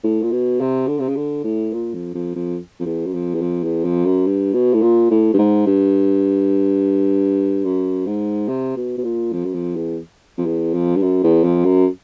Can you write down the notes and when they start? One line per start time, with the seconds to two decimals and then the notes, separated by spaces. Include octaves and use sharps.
0.04 A2
0.22 A#2
0.32 B2
0.60 C3
0.87 D3
1.00 C3
1.08 C#3
1.16 D3
1.44 A2
1.73 A#2
1.94 F2
2.14 F2
2.35 F2
2.80 F2
2.86 E2
3.06 F#2
3.14 F2
3.34 E2
3.41 F2
3.63 E2
3.84 F2
4.05 F#2
4.26 G2
4.53 B2
4.73 A2
4.82 A#2
5.11 A2
5.34 G2
5.38 G#2
5.66 G2
7.64 F#2
8.06 G#2
8.48 C3
8.76 B2
8.98 B2
9.04 A#2
9.32 F2
9.45 F#2
9.54 F2
9.76 E2
10.38 F2
10.46 E2
10.74 F2
10.96 G2
11.02 F#2
11.23 E2
11.44 F2
11.64 F#2